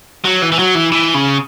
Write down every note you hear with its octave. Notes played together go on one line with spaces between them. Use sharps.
F#3
E3
E3
F#3
E3
E3
C#3